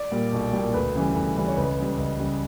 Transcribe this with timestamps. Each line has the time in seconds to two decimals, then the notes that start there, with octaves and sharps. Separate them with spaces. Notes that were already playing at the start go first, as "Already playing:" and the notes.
Already playing: D5
0.11 A#2 G3
0.33 B1
0.53 A#2 G3
0.74 D2 B4
0.95 C#3 E3 G3
1.15 D2
1.36 C#3 E3 G3
1.48 C#5
1.57 C#2 B4
1.78 C#3 G3
1.98 C#2
2.20 C#3 G3